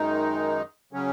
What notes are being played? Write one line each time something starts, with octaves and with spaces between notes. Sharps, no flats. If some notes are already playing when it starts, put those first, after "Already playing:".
Already playing: F#2 D#3 G#3 D#4
C#3 F#3 C#4